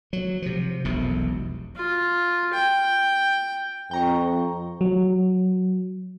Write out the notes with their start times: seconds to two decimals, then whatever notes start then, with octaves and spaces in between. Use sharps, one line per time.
0.13 F#3
0.42 C3 F3
0.84 E1 B1 F2 C3
1.76 F4
2.54 G5
3.91 F2 G5 A#5 C#6
4.81 F#3